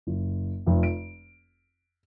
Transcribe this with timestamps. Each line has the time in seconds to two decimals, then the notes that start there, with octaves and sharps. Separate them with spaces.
0.07 F#1
0.67 F1 F2
0.83 D7